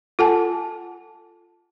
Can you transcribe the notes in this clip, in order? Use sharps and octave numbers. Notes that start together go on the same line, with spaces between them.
F4 A4 F#5 G#5 A5